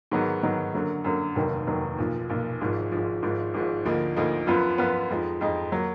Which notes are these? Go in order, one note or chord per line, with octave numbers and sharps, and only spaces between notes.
G#2 D#3 F#3 B3 D#4
G#2 D#3 F#3 B3 D#4
F#2 D3 F#3 A#3
F#2 D3 F#3 A#3
F1 D#2 D#3 F#3
F1 D#2 D#3 F#3
B1 A#2 F3
B1 A#2 F3
G#1 G#2 F3
G#1 G#2 F3
G#1 G#2 F3
G#1 G#2 F3
D2 D3 F3 A#3 D#4
D2 D3 F3 A#3 D#4
F#2 F3 B3 F4 B4
F#2 F3 B3 F4 B4
F2 F3 G#3 D#4
F2 F3 G#3 D#4
F#3 A#3